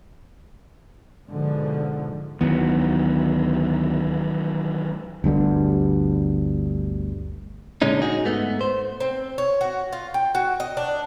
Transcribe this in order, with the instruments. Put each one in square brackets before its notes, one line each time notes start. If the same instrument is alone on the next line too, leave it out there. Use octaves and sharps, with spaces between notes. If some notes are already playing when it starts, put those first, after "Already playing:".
[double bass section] G#2 B2 D3 F3
[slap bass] D2 B3 [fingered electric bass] D#3 E3 F#3
[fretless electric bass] G1 D2 G2 D3
[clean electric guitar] A#2 D3 G#3 C#4 D#4
D#4 F#4 G#4
G#2 A3 B3
C5
[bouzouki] C4
C#5
F#4
F4
G5
F#4
D#5
D4